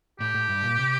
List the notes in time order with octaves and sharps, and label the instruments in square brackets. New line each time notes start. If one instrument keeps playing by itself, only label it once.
[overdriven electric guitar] A2 [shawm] G4
[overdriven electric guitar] A2
G2
A#2
C3